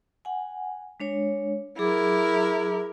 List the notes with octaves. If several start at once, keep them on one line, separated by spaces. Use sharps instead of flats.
F#5 G#5
G#3 D4 C#5
F#3 E4 G#4 A#4 D6